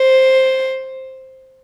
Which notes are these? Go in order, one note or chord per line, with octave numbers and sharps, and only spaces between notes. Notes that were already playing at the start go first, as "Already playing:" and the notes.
Already playing: C5